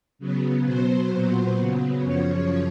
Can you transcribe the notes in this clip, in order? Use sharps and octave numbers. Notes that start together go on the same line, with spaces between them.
C#3 F#3 B3
B2 F#3 B3 C5
A#2 F#3 B3 C5
C#3 F#3 B3
F#2 C#3 F3 C#5